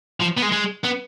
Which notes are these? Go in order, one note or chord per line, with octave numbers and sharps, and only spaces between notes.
F3
B3
G#3
G#3
B3